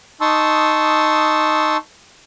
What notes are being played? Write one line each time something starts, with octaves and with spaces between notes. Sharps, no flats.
D#4 A5 C6 C#6 D#6 E6